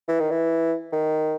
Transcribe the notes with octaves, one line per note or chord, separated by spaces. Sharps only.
E3
D#3
E3
D#3